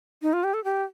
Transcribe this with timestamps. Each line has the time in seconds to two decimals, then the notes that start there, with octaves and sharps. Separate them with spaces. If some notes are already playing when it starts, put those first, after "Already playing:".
0.22 D#4
0.33 F4
0.44 G4
0.54 A4
0.64 G4